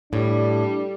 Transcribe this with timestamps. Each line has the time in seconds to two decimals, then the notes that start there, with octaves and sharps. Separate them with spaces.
0.13 A2 G3 D4